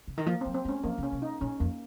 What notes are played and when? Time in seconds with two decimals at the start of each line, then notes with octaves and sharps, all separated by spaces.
0.08 C#3
0.18 D#3
0.26 F3 A#3
0.41 C4
0.46 F#3
0.54 C4
0.65 G#3
0.69 C#4
0.83 F3 A#3
0.98 C#3
1.03 C#4
1.12 C3
1.22 D#4
1.41 A#2 C#4
1.60 F2 A#3